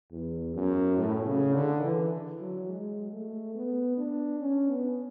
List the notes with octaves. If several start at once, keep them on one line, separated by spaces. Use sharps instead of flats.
E2
F#2
A2
C#3
D3
E3
F#3
G#3
A3
B3
D4
C#4
B3